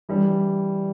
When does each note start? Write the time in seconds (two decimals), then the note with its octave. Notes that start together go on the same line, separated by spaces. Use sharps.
0.09 E3 G3 D4